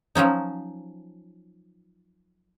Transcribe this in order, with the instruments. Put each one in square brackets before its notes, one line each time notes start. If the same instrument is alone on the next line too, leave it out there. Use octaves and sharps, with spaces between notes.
[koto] F3 F#3 C#4 D#4